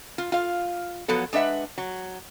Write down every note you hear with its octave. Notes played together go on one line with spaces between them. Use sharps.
F4
F4 F5
F3 F#3 B3 A4
G#3 D4 B4 E5 F#5
F#3